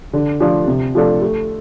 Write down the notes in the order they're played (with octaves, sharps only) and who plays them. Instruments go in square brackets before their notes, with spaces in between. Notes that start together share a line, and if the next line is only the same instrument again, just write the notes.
[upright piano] D3
F3 A3 D4
C3
F3 A3 D4 A4
A3